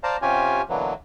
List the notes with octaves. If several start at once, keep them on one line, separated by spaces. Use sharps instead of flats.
C5 D5 F5 A5 A#5
C3 C#4 F4 G4 G#5
B2 D3 E3 F#3 A#3